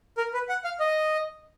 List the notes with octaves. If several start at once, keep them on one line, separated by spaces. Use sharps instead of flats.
A#4
B4
F#5
F5
D#5